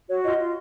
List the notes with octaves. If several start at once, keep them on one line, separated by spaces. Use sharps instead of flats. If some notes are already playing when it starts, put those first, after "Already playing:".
F#4 C#5
F4 D#5
F4